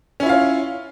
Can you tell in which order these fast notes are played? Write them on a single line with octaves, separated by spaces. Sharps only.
C#4 E4 F4 F5 C#5